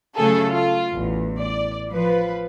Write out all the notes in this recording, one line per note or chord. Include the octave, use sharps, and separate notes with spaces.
C#3 F#3 A3 G#4 A4
F4
A1 E2
D5
F3 B4